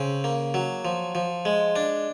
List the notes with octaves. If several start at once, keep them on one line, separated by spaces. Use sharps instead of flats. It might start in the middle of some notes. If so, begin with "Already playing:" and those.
Already playing: C#3 C4
A#3
F#3
F3
F3
G#3
D4